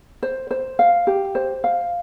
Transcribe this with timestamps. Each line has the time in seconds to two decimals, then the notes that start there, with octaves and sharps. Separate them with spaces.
0.23 C5
0.51 C5
0.79 F5
1.07 G4
1.35 C5
1.64 F5